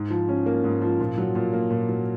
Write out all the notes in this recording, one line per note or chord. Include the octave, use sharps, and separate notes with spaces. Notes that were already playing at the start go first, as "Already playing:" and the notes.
Already playing: G#2
F3
C#4
A#3
G#2
F3
A#2
F#3
A#2
A#3
A#2
F#3